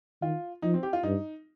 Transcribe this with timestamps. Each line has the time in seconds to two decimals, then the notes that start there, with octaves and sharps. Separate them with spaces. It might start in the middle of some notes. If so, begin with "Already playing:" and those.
0.22 D#3 F4
0.62 F3 D#4
0.74 C4
0.83 G4
0.93 F4
1.03 G2 D#4